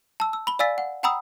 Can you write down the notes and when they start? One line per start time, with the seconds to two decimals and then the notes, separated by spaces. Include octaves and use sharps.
0.20 A5 E6
0.33 E6
0.47 B5 G7
0.59 D5 F5 G#5 E6 A6 B6
0.78 F#5
1.03 F#5 G5 A#5 B5 D#6 E6